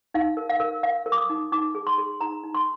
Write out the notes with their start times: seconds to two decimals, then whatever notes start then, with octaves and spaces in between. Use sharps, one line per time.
0.14 D#4 F5
0.37 A#4
0.49 F5
0.60 A#4
0.83 A#4 F5
1.06 A#4
1.12 D6
1.18 D#6
1.30 D#4
1.52 D#4 D6
1.75 G#4
1.87 C6
1.98 G#4
2.21 D#4 A#5
2.44 D#4
2.55 C6